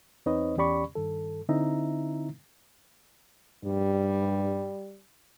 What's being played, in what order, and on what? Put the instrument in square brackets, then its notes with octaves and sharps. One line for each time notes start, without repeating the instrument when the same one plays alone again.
[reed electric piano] E2 C4 D#4 B4 C#5 D#5
E2 C#4 G4 D5 B5 C#6
G2 D#3 A4
D3 C4 D#4 E4 E5 A#5
[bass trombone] G2 [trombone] G3